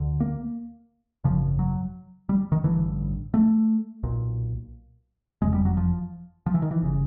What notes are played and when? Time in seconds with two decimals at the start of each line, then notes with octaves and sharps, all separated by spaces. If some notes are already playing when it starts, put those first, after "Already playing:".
Already playing: D2 D3
0.20 A#3
1.24 G#1 F#2 C#3 F3
1.59 F#3
2.29 G3
2.52 D#3
2.63 A1 G2 D3 E3
3.34 A3
4.03 B1 A#2
5.42 F#1 F2 C#3 G#3
5.54 G3
5.65 F#3
5.77 F3
6.46 F3
6.54 E3
6.62 D#3
6.71 E3
6.82 G1 C#3